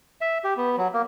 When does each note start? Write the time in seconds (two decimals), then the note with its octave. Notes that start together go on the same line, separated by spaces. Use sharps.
0.21 E5
0.44 G4
0.57 B3
0.77 F#3
0.93 A#3